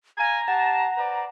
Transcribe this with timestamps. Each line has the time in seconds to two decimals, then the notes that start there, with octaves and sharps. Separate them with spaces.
0.18 F5 G#5 A#5
0.48 G4 F#5 A5
0.97 B4 C5 D5